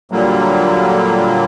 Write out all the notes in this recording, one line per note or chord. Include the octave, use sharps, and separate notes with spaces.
A#2 D3 F#3 G3 A#3